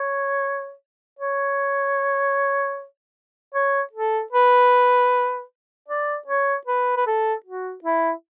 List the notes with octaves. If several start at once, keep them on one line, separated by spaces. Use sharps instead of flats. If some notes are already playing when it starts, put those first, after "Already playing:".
Already playing: C#5
C#5
C#5
A4
B4
D5
C#5
B4
B4
A4
F#4
E4